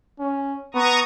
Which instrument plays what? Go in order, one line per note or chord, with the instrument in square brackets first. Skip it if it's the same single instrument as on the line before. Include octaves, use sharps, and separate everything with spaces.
[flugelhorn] C#4
[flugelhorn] B3 [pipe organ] A#5 C#6 D#6